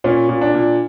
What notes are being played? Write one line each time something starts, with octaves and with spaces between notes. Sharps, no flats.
A#2 C#4
A#2
D4
A#2